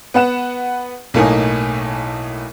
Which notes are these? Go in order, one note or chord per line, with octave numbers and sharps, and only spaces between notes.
B3 B4 F#5 E7
B1 A2 A3 A#3 D#4 G#5